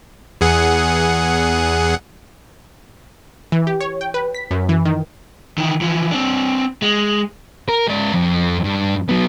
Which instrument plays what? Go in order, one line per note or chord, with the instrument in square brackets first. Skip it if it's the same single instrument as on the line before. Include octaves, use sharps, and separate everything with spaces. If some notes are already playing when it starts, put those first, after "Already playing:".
[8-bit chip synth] E2 G#4 F#5
[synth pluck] E3
G4
C#5
G5
B4
B6
F#2
E3
D#3
[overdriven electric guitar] D#3 E3
E3 F3
C4 D4
G#3
[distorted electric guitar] A#4
G#2 D5
F2
G2
F#3 B3